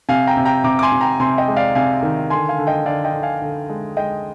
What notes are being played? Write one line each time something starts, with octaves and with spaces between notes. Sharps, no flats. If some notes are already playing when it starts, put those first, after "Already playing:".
C3 F5 G#5
G5 A#5
C3
G5 A#5
C3 A#5 D6
D6
G#5 C6
C3
G5 A#5
C3 G#5 C6
D#5 G5
G#3
D5 F5
C3 F5 G#5
D#3
D3 G#5 C6
F5 G#5
D3
D#5 G5
D3 D5 F5
D#5 G5
D3
F5 G#5
D3
G#3
G#3 D#5 G5